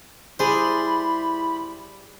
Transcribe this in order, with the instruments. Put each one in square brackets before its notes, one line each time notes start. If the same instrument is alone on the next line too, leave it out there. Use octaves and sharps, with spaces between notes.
[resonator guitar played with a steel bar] G3 G#4 [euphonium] E4 [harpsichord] C5 [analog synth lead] B5